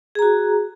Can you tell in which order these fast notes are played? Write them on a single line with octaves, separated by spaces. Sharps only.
G#4 A#5 F#4